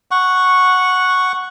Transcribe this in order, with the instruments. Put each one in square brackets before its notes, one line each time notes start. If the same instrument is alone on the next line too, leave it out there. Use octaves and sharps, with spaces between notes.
[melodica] F#5 C#6